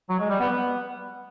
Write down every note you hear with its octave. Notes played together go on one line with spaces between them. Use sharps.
F#3
G#3
G3
B3
B3